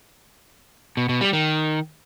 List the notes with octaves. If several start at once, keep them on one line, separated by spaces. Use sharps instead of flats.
B2
B2
G3
D#3